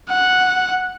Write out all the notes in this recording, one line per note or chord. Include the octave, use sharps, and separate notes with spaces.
F#5